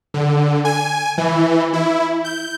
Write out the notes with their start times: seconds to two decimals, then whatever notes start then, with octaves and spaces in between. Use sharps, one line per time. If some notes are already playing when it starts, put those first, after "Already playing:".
0.14 D3
0.65 G#5
1.18 E3
1.73 E4
2.25 G6